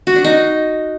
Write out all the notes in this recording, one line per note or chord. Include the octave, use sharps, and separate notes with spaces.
F#4
D4
D#4